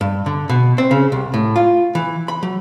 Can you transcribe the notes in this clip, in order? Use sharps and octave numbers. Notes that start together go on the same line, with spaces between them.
G2
D3
B2
C4
C#3
C2
A2
F4
E3
B5
F#3